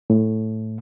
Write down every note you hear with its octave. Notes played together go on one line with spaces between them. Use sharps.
A2